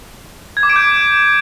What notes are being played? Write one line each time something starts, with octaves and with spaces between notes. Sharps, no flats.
G#6
D6
D7
G6